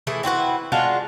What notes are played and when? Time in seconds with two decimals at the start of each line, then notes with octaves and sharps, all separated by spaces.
0.07 E3 A3 E4 G#4
0.23 C4 E4 F#4 B4
0.72 G#3 D4 F4 F#4